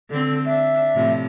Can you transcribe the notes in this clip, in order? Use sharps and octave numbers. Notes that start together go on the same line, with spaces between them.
D3 C4 A4
D4 E5
A2 C3 F3